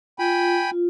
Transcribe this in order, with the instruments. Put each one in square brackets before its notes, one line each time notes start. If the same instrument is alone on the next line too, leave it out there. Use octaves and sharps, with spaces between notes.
[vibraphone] F4 [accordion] G5 G#5 B5
[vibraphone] F4